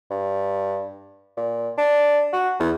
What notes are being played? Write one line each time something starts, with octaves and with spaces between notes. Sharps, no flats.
G2
A#2
D4
F#4
E2